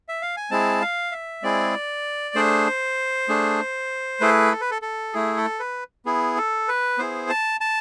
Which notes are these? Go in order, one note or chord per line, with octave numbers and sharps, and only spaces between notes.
E5
F5
G#5
G#3 C4 E4 G#4 A5
F5
E5
G#3 C4 E4 G#4 D5
A3 D4 G#4 C5
A3 D4 G#4
A3 E4 G#4 B4
A4
B4
A4
A4
A3 E4 G#4
A4
B4
B3 E4 G#4
A4
B4
B3 E4 G#4 C5
A5
A5